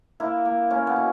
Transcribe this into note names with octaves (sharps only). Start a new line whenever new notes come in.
A#3 E4
A#3
A#3 C#4
B3
B2